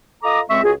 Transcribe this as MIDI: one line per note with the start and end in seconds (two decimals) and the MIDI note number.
0.23 0.41 65
0.23 0.41 69
0.23 0.41 75
0.23 0.41 82
0.23 0.41 86
0.23 0.41 87
0.49 0.62 37
0.49 0.62 56
0.49 0.62 60
0.49 0.62 76
0.49 0.62 85
0.64 0.73 37
0.64 0.73 65
0.64 0.73 66
0.64 0.73 68